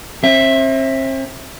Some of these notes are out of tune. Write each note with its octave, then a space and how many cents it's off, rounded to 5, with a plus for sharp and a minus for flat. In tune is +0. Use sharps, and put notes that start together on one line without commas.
C4 +40 E5 +0